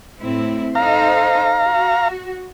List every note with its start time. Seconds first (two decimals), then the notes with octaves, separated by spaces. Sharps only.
0.20 A2 C4 E4
0.75 D#4 A4 C5 F5 A#5
1.63 F#4